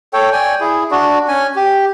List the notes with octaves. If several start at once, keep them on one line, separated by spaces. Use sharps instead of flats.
A4 C#5 G5
D5 G5 G#5
E4 G#4
D4 F#4 D5
C#4 G#5
G4